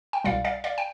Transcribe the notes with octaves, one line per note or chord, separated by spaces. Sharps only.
G5
C2 B2 G3 D5 F5
D5 F5
D5 F5
G5